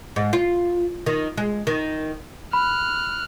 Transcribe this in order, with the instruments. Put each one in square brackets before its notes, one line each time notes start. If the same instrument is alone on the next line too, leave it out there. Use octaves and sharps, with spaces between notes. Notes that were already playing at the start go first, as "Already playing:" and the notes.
[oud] G#2
F4
D#3
G#3
D#3
[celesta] B5 [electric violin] F6 F#6